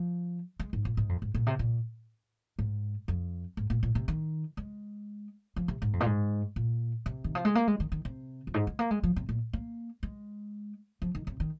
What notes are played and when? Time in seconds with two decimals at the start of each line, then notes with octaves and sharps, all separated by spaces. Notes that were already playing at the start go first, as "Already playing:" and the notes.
Already playing: F3
0.60 G#3
0.73 G#2
0.85 A#2
0.97 G#2
1.09 F2
1.22 G#2
1.34 A#2
1.47 C3
1.59 A#2
2.59 G#2
3.08 F2
3.57 G#2
3.70 A#2
3.83 A#2
3.95 C3
4.08 D#3
4.57 G#3
5.56 F3
5.68 C3
5.82 G#2
5.93 F2
6.00 A#2
6.06 G#2
6.56 A#2
7.06 C3
7.24 D#3
7.35 F3
7.45 G#3
7.55 A#3
7.67 G#3
7.80 D#3
7.92 D#3
8.05 C3
8.47 F2
8.54 G#2
8.67 G#3
8.79 A#3
8.91 G#3
9.03 F3
9.16 C3
9.29 A#2
9.53 A#3
10.03 G#3
11.02 F3
11.15 D#3
11.27 C3
11.40 D#3